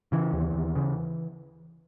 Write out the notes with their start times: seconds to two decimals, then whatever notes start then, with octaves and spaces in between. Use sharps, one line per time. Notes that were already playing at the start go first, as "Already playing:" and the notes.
0.12 C#3 E3
0.33 D#2
0.54 D#2
0.75 C#3